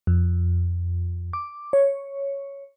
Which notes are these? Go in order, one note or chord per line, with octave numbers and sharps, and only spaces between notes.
F2
D6
C#5